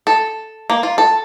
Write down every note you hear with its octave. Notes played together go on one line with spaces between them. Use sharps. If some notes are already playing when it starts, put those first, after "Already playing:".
A4
A#3
F4
A4